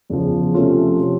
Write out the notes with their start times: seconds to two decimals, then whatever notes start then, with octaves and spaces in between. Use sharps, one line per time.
0.10 E2 C#3 F3
0.54 C3 F3 A3 C#4 F4
0.99 C3 F3